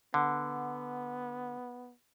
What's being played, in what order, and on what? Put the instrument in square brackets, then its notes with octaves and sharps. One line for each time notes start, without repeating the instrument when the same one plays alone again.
[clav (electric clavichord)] D3 [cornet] B3